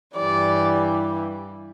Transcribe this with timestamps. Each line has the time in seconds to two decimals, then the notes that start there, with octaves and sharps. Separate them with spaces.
0.16 G2 E3 G3 D5